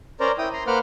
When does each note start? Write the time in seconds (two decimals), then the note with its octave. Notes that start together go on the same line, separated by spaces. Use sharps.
0.20 C#4 A#4 C5 D5 A#5
0.38 E4 G5 D#6
0.53 A#5 C6
0.67 A#3 B4 C5 F#5 D6 F6